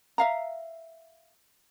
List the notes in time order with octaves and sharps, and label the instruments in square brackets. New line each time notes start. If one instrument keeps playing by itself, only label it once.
[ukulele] E5 F5 A#5